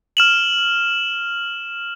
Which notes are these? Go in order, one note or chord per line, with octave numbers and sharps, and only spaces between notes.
F6 E7 F#7